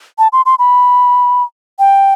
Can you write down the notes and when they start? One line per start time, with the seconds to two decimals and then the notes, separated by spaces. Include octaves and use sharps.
0.18 A5
0.33 C6
0.46 C6
0.59 B5
1.79 G5